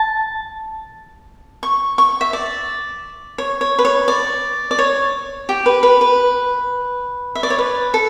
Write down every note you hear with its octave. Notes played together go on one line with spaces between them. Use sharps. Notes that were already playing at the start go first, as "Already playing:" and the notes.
Already playing: A5
C#6
C#6
E5
D5
C#5
C#5
B4
C#5
D5
D5
C#5
G4
B4
B4
B4
E5
D5
C#5
B4
A4